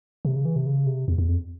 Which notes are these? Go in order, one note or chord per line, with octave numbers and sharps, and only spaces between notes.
C3
C#3
E3
C3
C#3
C3
E2
E2
F2